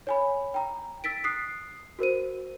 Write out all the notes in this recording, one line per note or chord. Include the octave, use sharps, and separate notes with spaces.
C#5 G#5 B5
G5 A#5
E6 A6 B6 D7
D#6 F#6 C7
F#4 A#4 C5 D#7